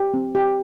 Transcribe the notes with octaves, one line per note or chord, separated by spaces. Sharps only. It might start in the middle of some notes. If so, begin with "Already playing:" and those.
Already playing: G4
C4
G4